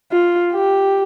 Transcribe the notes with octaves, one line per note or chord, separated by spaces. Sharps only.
F4
G4